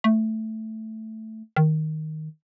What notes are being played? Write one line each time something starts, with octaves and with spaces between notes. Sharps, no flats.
A3
D#3